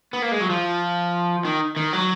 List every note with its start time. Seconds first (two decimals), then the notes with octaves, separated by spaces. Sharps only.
0.13 B3
0.22 A#3
0.32 G#3
0.41 F#3
0.50 F3
1.45 D#3
1.77 D#3
1.93 F#3